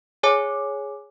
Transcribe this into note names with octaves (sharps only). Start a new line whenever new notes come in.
G#4 C#5 G#5 D6